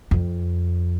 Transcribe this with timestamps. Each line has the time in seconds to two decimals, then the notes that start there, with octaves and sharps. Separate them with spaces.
0.11 F2